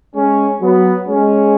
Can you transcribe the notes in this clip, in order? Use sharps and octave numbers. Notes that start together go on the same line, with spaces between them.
G#3 C#4
F#3 B3
G#3 C#4